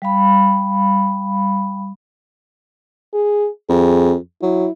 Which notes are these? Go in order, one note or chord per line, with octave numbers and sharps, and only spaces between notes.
G3 F5 B5
G#4
F2 G#4
F#3 E4